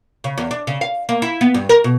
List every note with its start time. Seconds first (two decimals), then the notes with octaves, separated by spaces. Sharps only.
0.24 C#3
0.38 E2
0.51 D4
0.67 C#3
0.81 F5
1.09 A#3
1.22 E4
1.41 B3
1.54 G2
1.69 A#4
1.84 B2